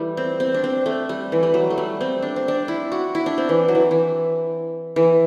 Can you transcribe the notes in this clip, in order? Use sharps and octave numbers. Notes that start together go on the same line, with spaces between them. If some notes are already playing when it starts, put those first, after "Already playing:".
Already playing: E3 G3 A3
C4
C4
D4
C4
A3
G3
E3
G3
F#3
A3
G3
C4
D4
C4
D4
E4
F#4
E4
D4
C4
E3
F#3
E3
E3
E3